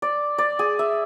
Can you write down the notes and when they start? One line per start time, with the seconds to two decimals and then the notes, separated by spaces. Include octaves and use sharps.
0.02 D5
0.38 D5
0.59 G#4
0.79 E5